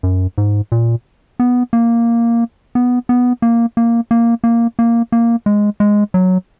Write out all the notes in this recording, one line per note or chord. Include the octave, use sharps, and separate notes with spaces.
F#2
G#2
A#2
B3
A#3
B3
B3
A#3
A#3
A#3
A#3
A#3
A#3
G#3
G#3
F#3